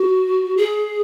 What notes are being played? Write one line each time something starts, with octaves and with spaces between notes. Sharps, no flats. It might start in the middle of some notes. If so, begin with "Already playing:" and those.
Already playing: F#4
G#4